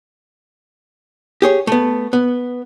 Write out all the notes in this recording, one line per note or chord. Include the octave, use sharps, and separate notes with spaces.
G4 G#4 C#5
A3 B3
B3